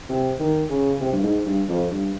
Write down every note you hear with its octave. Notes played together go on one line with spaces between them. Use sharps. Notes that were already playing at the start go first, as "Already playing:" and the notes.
C3
D#3
C#3
C3
G2
G#2
G2
F2
G2